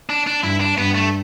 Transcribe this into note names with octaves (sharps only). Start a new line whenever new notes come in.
D4
D4
G2 E4
D4
G2 B3
A3